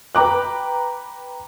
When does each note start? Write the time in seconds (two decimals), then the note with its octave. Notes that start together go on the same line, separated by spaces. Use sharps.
0.15 B4 G5 A#5 D6 F#6